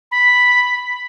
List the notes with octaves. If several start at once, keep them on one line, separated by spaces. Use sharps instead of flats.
B5